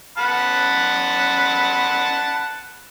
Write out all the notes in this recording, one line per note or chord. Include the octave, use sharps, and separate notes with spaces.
F#5 A5 B5